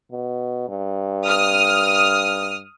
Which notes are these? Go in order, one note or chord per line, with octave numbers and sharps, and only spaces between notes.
B2
G2
D#6 F6